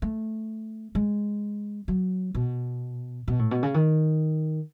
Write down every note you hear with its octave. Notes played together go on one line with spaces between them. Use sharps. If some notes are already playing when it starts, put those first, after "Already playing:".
A3
G#3
F#3
B2
B2
A2
B2
C#3
D#3